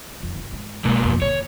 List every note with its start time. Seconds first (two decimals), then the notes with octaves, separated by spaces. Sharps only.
0.20 F2 D#3
0.36 G1 C2
0.53 G#2
0.85 B2 F#3 G#3 A#3
1.00 G1 F2
1.22 D#2 D3 C#5